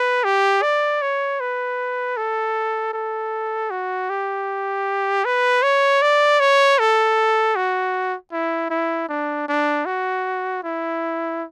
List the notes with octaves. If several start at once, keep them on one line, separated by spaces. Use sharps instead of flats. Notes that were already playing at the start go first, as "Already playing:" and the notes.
Already playing: B4
G4
D5
C#5
B4
A4
A4
F#4
G4
B4
C#5
D5
C#5
A4
F#4
E4
E4
D4
D4
F#4
E4